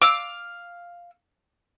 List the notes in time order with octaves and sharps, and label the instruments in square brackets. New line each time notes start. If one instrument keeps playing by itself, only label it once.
[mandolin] F5 E6 [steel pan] D6